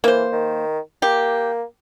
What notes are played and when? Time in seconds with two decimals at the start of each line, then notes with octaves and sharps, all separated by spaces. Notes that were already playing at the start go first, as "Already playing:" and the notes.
0.04 E3 A#3 C5
0.32 D#3
1.02 A#3 G4